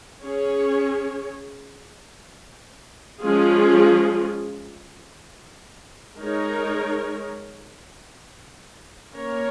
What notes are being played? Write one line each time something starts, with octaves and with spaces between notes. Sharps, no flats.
C#4 G#4 C#5
F3 G#3 C#4 F4 G#4
G#3 D#4 A#4 C#5
A#3 C#4 A#4 C#5